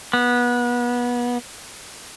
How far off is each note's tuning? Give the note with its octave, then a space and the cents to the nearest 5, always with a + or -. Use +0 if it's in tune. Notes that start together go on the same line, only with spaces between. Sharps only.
B3 -25